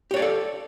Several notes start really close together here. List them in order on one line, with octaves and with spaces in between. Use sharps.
G4 C#5 D5 F5 A4